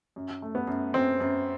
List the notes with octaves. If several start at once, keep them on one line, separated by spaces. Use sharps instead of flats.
F#2
A3
B3
F#2
F#2 C4
F#2